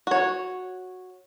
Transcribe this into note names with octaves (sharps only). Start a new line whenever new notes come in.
F#4 C#5